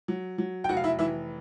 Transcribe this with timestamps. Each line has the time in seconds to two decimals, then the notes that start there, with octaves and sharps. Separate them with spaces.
0.08 F#3
0.38 F#3
0.64 G5
0.69 F1 F#4 F#5
0.77 F5
0.84 E4 E5
0.99 E3 E4 E5